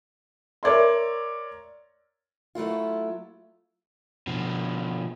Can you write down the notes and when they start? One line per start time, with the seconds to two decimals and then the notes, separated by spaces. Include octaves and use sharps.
0.63 A#4 C#5 D5 E5 C6
2.55 F#3 A3 E4 F4
4.27 B2 F3